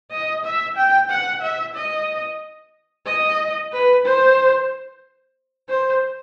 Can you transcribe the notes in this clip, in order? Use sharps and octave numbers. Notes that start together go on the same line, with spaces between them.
D#5
E5
G5
F#5
E5
D#5
D#5
B4
C5
C5